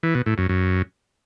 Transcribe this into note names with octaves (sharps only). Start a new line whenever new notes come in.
E3
B2
A2
F#2
F#2